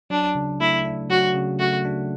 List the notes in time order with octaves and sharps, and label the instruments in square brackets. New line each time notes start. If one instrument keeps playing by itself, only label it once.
[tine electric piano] F#3 [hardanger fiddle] D4
[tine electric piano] C#3
[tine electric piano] A3 [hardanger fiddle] E4
[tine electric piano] D4
[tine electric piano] F#3 [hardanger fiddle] F#4
[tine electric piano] C#3
[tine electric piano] A3 [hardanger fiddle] F#4
[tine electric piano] D4